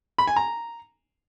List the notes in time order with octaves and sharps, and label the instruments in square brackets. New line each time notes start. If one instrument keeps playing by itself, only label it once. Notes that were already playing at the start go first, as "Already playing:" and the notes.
[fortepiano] B5
G#5
A#5